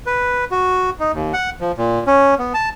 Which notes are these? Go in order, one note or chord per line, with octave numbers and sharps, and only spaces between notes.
B4
F#4
D#4
D#2
F#5
F3
A#2
C#4
B3
A5